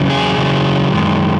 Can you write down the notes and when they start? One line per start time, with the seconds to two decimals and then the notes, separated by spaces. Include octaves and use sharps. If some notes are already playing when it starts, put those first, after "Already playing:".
Already playing: E2 C#3 F#3
0.10 G#4
0.37 E2 C#3 F#3
0.93 F#2 D#3 G#3